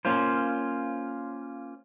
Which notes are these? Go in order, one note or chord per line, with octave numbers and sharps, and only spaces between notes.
A#3 C#4 F4 C5